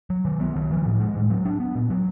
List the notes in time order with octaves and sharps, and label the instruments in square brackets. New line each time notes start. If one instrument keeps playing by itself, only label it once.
[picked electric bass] F#3
D#3
B3
D#3
F3
A2
G#3
A2
F#3
D4
B3
A#2
F#3